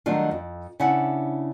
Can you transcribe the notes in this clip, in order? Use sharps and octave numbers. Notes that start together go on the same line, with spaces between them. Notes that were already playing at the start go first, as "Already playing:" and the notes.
D#3 F#3 G3 A3 D4 F4
F2
C#3 D4 E4 E5 F#5